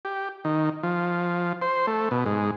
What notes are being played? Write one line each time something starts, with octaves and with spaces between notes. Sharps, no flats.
G4
D#3
F3
C5
A3
B2
G#2